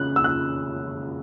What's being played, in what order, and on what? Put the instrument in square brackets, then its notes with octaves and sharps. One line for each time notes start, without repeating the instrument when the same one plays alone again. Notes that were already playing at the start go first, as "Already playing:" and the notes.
Already playing: [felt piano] C#3 [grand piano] F#6
[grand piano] E6
F#6